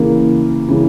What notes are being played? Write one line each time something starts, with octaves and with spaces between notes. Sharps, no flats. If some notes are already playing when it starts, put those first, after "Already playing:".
Already playing: C#3 E3 A#3
C#3 E3